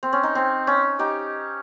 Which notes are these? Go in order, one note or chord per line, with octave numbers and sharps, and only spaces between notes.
C4
C#4
D#4
C4
C#4
D#4 G4